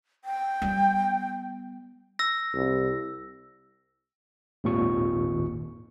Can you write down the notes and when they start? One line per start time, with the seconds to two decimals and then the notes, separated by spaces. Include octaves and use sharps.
0.25 G5
0.62 G3 B3
2.19 E6 A#6
2.54 C2
4.64 G#1 D#2 A#2 C#6